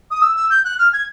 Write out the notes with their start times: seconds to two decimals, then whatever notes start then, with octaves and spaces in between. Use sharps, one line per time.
0.11 D#6
0.22 E6
0.36 E6
0.50 G6
0.65 F#6
0.79 F6
0.93 G#6